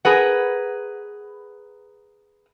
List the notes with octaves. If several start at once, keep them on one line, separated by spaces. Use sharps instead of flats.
G#4 A#4 B4 F#5